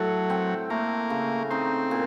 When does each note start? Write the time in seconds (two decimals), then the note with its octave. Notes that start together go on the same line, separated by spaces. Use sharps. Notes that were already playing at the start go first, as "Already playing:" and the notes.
Already playing: A2 F#3 A4
0.30 C4
0.70 A3 A#3
1.10 C#3
1.50 C4 D#4
1.91 A#2